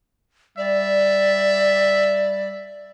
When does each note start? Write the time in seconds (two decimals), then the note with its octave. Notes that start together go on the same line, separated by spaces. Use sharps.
0.58 G3 D5 E5